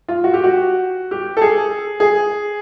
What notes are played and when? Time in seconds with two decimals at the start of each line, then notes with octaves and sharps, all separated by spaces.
0.08 F4
0.24 F#4
0.34 G4
0.44 F#4
1.11 G4
1.37 A4
1.41 G#4
2.00 G#4